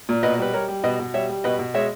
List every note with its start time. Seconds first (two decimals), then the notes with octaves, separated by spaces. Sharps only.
0.09 A#2
0.23 B2 B4 D#5
0.38 G3 B4
0.53 G3 A#4 C#5
0.69 G3
0.84 B2 B4 D#5
1.00 B2
1.14 G3 C#5 E5
1.29 G3
1.44 B2 B4 D#5
1.59 B2
1.74 G#3 C#5 E5